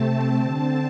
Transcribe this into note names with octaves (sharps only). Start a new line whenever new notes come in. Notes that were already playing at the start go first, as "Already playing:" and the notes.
Already playing: C3 A3 C4 A5
D3 C4